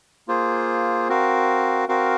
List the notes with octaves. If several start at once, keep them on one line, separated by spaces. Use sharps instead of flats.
A#3 F4 G#4 C5
C4 F#4 A#4 F5
C4 F#4 A#4 F5